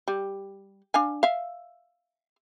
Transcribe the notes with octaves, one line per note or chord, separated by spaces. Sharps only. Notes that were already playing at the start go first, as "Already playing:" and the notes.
G3
D4 F5 G#5
E5 F5